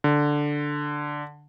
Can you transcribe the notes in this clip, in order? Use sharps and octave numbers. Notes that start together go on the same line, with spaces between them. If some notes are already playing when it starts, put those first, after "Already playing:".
D3